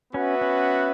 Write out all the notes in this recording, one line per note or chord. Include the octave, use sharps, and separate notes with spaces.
B3 C#4 F#4 B4 E5
C#4